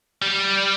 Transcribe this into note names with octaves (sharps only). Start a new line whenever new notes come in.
G3